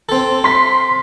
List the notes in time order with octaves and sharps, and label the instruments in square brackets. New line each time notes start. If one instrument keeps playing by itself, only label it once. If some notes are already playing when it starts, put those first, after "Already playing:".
[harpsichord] C4 A4
[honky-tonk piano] C6 B6